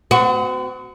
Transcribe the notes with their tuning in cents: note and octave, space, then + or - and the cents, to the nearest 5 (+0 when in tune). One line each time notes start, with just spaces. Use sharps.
C4 -45 F#4 +0